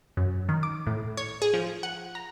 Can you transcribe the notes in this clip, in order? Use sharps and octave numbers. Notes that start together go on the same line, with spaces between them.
F#2
D#3
D6
A2
C#5
G#4
F3
F#5
A#5